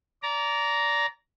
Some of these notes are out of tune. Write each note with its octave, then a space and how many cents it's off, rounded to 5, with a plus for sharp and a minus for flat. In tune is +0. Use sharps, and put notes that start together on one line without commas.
D5 -25 A#5 +0